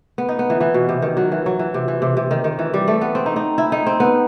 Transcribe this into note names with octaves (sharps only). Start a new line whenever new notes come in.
B3
D#4
B3
E3
E3
B2
C3
D#3
F#3
E3
F#3
E3
C3
E3
C3
C3
D#3
D#3
E3
G3
A3
B3
C4
D#4
D#4
E4
D#4
C4
B3